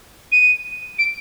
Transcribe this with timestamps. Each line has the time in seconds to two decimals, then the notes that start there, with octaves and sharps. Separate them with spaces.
0.32 D#7
0.99 D7